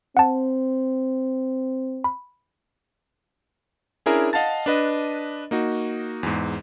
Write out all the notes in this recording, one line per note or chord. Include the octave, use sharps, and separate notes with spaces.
C4 F#5 A5
B5
C#4 D4 E4 G#4 A#4
D#5 F5 F#5 A5 A6
D4 B4 D#5
A#3 D#4 F#4
E2 G#2